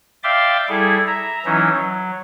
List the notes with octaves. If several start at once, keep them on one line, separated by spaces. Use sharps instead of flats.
D5 E5 F5 G5 C6 D6
G3 E4 G#4 A4
E5 A#5
E3 F#3 C#4 D#4 E4
F#3